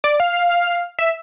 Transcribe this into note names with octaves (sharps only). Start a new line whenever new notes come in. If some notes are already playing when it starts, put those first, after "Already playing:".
D5
F5
E5